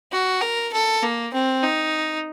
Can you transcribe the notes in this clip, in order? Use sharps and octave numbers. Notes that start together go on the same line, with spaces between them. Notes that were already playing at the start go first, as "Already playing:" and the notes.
F#4
A#4
A4
A#3
C4
D#4